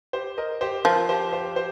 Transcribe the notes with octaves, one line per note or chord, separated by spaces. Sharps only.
G4 C5
A#4 D#5
G4 C5
F3 F4 A#4
G4 C5
G4 C5
G4 C5